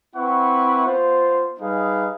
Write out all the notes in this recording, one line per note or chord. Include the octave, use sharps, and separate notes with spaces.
C4 E4 B4 F#5 C#6
B3 F4 C5
G3 D#4 G#4 B4 F5